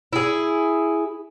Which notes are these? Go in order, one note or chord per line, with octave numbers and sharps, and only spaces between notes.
E4 G#4